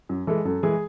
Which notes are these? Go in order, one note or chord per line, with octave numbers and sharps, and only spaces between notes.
F#2
E3 G#3 A4
F#2 A4
E3 G#3 G#4